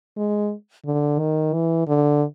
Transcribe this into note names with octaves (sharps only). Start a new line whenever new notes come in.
G#3
D3
D#3
E3
D3